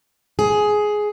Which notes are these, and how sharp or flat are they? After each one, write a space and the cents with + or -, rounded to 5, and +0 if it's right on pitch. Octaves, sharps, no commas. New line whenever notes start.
G#4 +10